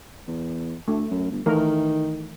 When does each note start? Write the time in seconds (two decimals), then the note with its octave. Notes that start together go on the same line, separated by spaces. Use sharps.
0.27 E2
0.88 D2 A3
1.11 F#2
1.32 G1
1.46 D#3 E3 A3 A#4